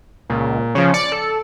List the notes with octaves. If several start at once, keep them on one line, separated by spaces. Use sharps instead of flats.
C#2 A#2
C#3 F3 C#4
D5 C#7
A4